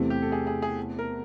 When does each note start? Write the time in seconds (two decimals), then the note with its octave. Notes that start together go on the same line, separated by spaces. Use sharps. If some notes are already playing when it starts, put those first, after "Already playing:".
Already playing: E2 C3 E3 A3 C4
0.10 G4
0.22 A4
0.32 G#4
0.47 G#4
0.62 G#4
0.99 A#4